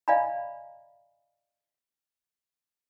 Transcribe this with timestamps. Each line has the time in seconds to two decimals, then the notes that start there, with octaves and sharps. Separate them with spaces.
0.08 D5 D#5 F5 G#5 A#5 B5